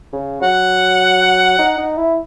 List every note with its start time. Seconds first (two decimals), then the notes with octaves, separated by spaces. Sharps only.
0.13 C#3
0.41 F#3 F#5
1.58 D#4
1.78 D#4
1.97 E4